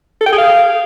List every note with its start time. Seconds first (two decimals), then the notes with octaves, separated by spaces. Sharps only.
0.21 A4
0.26 G5
0.32 G#4
0.38 F5